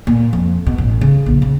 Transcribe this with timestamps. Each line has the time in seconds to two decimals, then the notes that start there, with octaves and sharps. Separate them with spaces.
0.07 A#2
0.33 F2
0.66 B2
0.78 A1
1.01 C#3
1.26 A#1
1.42 C#3